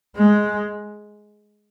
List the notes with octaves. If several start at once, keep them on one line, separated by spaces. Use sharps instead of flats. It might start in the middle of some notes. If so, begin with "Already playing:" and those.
G#3